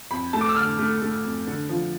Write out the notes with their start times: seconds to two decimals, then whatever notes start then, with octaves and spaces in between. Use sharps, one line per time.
0.11 F2 B5
0.33 A3 A5
0.41 D6
0.49 E6
0.56 D3 F6
0.79 A3
1.02 A3
1.24 F2
1.47 D3
1.69 F3